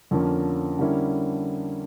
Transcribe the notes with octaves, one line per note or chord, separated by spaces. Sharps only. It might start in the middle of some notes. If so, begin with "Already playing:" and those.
F2 D3 F3 A#3 C#4
D3 G3 A#3 C#4 E4